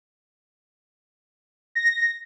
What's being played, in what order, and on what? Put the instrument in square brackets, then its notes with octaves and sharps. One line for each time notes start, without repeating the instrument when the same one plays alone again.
[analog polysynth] A#6